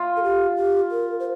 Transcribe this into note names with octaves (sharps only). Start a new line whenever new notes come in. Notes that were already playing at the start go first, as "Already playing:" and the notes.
Already playing: F4
A4
G4
G4
A#4
C5